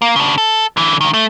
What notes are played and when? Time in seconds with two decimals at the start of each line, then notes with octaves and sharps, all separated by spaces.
0.02 A#3
0.16 C#3 D4
0.38 A4
0.77 D3 E3
1.01 C#2 D#3
1.14 A3